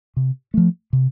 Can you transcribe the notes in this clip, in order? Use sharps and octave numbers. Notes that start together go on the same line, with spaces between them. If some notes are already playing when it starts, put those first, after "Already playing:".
C3
F3 A3
C3